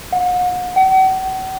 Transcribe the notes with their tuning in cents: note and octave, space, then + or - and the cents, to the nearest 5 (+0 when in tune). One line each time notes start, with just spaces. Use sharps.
F#5 -40
F#5 +40